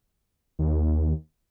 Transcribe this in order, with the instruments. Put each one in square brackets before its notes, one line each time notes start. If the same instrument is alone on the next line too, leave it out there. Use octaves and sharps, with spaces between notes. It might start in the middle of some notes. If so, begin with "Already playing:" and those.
[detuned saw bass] D#2